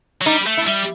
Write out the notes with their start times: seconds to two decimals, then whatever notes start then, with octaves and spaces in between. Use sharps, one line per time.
0.21 F#3
0.25 G3 D#4
0.47 A3
0.57 E4
0.67 G3